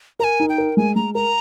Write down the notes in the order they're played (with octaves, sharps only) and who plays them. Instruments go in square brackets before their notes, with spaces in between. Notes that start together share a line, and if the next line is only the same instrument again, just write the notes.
[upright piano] A#4 [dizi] A#5
[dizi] G#5
[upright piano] D#4
[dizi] G5
[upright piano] A#4
[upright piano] G#3 [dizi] G#5
[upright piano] G#3 [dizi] A#5
[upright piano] A#4 [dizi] A#5